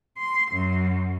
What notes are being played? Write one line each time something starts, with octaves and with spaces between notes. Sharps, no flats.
C6
F#2